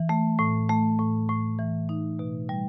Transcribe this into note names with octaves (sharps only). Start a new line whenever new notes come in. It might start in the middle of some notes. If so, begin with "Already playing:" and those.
Already playing: E3
A3
A2
A3
A2
A2
E3
D#4
B2
G3